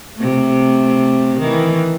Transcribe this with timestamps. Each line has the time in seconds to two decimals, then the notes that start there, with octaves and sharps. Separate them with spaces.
0.17 C3 A3
1.39 D#3 E3